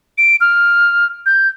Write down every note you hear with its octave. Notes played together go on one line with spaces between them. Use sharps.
D7
F6
G6